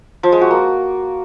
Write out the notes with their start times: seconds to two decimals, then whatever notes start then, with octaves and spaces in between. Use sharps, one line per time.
0.23 F3
0.32 G#3
0.41 F#4
0.51 A#3